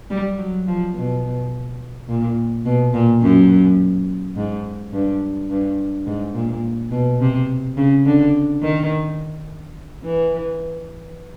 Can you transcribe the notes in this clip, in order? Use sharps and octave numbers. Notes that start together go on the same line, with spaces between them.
G3
F#3
F3
B2
A#2
B2
A#2
F#2
G#2
G2
G2
G#2
A#2
B2
C3
C#3
D3
D#3
E3